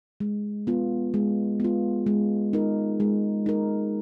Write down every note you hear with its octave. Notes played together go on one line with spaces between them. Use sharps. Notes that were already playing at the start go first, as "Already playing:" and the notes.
G#3
B3 F4
G#3
B3 F4
G#3
D#4 A#4
G#3
D#4 A#4